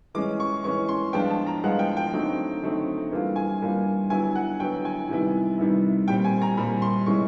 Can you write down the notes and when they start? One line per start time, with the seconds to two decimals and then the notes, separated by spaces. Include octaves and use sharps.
0.15 E3 G#3 C#4 D6
0.40 C#6
0.64 E3 G#3 C#4 C#6
0.89 C6
1.13 F3 G#3 B3 D4 F4 G5
1.31 A5
1.47 A#5
1.64 F3 G#3 B3 D4 F4 F#5
1.79 G5
1.97 G5
2.12 D3 F#3 A3 C4 D#4
2.62 D3 F#3 A3 C4 D#4
3.11 E3 G3 A#3 D4 F4
3.36 G#5
3.61 E3 G3 A#3 D4 F4
4.10 D3 F#3 B3 E4 G#5
4.35 F#5
4.60 D3 F#3 B3 E4 G5
4.85 G#5
5.09 C3 D#3 G3 B3 E4
5.58 C3 D#3 G3 B3 E4
6.08 A#2 G3 C4 G5
6.25 G#5
6.42 A#5
6.57 A#2 G3 C4 B5
6.82 C6
7.06 C3 E3 G#3 C#4 E4 C#6